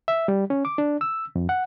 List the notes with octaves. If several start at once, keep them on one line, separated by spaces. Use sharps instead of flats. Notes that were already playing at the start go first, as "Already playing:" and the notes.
E5
G3
C#4
D6
D4
E6
F2
F#5